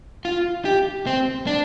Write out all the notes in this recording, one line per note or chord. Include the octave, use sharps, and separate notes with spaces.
F4
G4
C4
D4